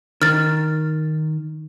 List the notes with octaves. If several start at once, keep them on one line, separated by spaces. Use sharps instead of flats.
D#3 F6 A6